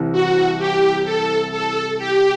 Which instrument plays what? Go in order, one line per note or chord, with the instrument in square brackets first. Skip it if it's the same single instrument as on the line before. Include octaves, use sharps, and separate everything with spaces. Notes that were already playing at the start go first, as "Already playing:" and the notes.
Already playing: [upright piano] C2 C3 E3
[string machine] F#4
G4
A4
A4
G4